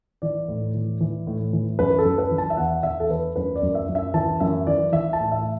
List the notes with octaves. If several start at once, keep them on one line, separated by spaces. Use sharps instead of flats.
E3 D5
A2
E3
E3
A2
E3
F#2 B4
A4
F#2
B4
E3
A5
E5
E2 F#5
E2 E5
A4
E2 B4
F#2 B4
D5
F#2
E5
F#2
E5
E3 A5
F#2 E5
E3 D5
E3 E5
A5
A2
E5